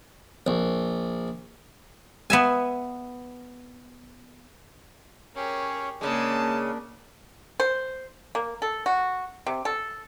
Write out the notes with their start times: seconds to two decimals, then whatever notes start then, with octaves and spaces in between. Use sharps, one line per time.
0.47 A#1
2.30 B3 E5 G#5
5.36 C#4 G4 G#4 A#4 C#5
6.01 C#3 G#3 A#3 C#4 D4 A5
7.60 C5
8.35 A#3
8.62 A4
8.86 F#4
9.47 C3
9.65 A4